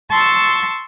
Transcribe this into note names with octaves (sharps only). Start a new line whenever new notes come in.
A5 C6 C#6 E6